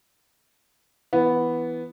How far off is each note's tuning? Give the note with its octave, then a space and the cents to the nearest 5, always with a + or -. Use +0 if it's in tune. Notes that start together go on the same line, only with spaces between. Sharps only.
E3 +0 B3 +0